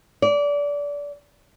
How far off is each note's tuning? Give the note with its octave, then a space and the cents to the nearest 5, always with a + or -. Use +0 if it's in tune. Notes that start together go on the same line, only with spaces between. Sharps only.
D5 -25